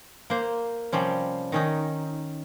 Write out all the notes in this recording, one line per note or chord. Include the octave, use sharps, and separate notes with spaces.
A#3 C5
C3 F3 G3 C#4
D#3 C#4 D#4